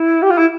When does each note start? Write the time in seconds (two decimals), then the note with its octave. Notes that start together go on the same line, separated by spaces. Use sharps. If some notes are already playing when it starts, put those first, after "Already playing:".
Already playing: E4
0.23 G4
0.31 F4
0.38 E4